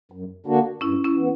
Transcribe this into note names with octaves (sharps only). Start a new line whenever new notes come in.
F#2
D3 A#3 D4 F#4
G2 C#4 E4
C#4 E4
E3 B3